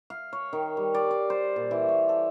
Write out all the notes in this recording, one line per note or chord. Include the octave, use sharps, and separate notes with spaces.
F5
C#5
D#3
G3
D5
D5
C5
A#2
E3
C#5
A4